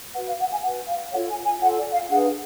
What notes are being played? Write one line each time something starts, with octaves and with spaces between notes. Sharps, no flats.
F#4 B4 F#5
F5
F#5
G#5
F#4 B4 F#5
F5
F4 A4 C#5 F#5
G#5
G#5
F4 A4 C#5 F#5
D5
F5
D4 G#4 B4 F#5